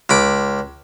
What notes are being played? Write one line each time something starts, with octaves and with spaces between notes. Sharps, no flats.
C#2 B5 D6